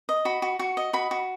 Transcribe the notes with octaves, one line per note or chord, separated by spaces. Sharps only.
D#5
F#4 B5
F#4
F#4 C#6
D#5
F#4 B5
F#4